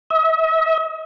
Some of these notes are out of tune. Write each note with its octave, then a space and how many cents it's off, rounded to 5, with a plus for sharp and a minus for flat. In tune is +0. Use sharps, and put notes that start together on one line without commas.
E5 -45